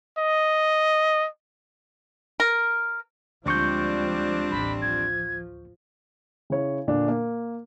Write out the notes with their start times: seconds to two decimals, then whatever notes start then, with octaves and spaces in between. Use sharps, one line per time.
0.18 D#5
2.40 A#4
3.46 D2 F3 G3 G#3 C4 D4 C#6 G6
4.51 A1 D#2 B5
4.82 F3 G#6
6.50 C#3 E4 C#5
6.88 A#2 D3 D4
7.08 A#3